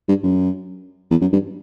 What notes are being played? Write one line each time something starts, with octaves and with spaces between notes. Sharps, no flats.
G2
F#2
E2
F#2
G2